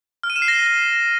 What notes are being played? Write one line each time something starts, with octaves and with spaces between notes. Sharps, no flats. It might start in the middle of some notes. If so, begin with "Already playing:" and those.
F6
D#7
E7
C7
A#6